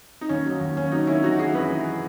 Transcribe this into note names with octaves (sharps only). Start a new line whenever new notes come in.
D#4
D#2 C#4
F#3
D#2
D#2 C#4
F#3 D#4
D#3 C#4 E4
E3 D#4 F#4
E3 E4 G#4
F#2 G#4 B4
E3